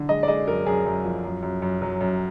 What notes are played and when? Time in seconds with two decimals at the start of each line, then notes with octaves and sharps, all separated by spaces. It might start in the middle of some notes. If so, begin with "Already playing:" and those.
Already playing: D3
0.09 G#3 D#5
0.23 D5
0.28 G#3 D#5
0.47 F#2 A#4
0.66 F#2 G#4
0.86 F#2
1.05 F3
1.24 F#2
1.43 F#2
1.62 F#2
1.82 F#3
2.01 F#2